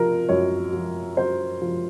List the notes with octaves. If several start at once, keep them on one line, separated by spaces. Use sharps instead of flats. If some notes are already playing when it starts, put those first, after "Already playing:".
Already playing: F3 A#4
F#2 C#5
F3
F#2 C5
F3